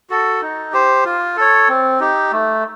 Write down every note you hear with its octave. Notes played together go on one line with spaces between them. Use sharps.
F#4 A4
D#4
G4 C5
F4
A4 C#5
C4
D#4 G4
A3